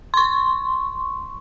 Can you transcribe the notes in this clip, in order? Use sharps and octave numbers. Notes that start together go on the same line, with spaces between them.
C6 C#6